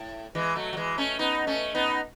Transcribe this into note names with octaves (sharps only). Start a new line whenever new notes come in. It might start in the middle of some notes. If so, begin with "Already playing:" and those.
Already playing: A2
E3 G#3
F#3 A3
F#3
E3 G#3
A3 C#4
B3 D#4
A3 C#4
B3 D#4